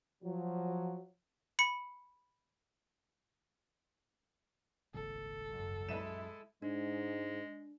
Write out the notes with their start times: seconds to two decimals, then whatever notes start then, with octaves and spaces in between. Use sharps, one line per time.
0.24 F3 F#3
1.59 B5 C#7
4.94 D#1 G#1 C#2 A4
5.50 F#2
5.89 F#2 G#3 E4 E5 D#7 E7
6.62 G#2 G#3 D4